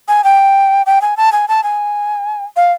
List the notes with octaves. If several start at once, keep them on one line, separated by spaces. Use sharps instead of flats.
G#5
G5
G5
G#5
A5
G#5
A5
G#5
F5